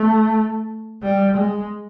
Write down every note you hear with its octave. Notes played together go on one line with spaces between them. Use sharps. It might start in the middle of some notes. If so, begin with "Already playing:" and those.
Already playing: A3
G3
G#3